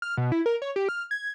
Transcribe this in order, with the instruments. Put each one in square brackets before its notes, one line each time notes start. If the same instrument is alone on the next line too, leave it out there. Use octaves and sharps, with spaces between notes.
[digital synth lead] F6
B2
E4
A#4
C#5
G4
F6
G#6